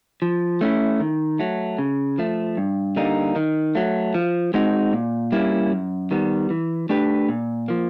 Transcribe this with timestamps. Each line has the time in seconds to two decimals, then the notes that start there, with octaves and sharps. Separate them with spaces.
0.22 F3
0.61 A3 C#4 E4
1.00 D#3
1.39 F#3 A3
1.79 C#3
2.18 F3 A3
2.57 G2
2.96 D3 G3 A#3 D#4
3.36 D#3
3.75 F#3 A3
4.14 F3
4.54 G#3 C4 D#4 F#4
4.93 A#2
5.32 G3 A#3 C#4 E4
5.71 F#2
6.11 D#3 G3 B3
6.50 E3
6.89 A3 D4 G4 B4
7.29 A#2
7.68 F3 A#3